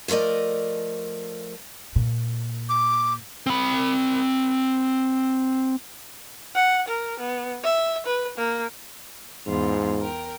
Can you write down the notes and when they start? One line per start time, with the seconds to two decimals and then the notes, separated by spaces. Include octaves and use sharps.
0.08 F3 A3 A#4 D5 D#5
1.96 A#2
2.69 D6
3.46 C4 B5
6.55 F#5
6.88 A#4
7.20 B3
7.64 E5
8.06 B4
8.38 A#3
9.47 E2 G#2 F4
10.01 A#4 G5